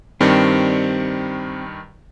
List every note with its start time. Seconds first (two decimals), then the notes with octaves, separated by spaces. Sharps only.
0.21 G2 D#3 G3 C4